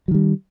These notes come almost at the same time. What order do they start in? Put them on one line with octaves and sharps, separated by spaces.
F#3 D#3 G3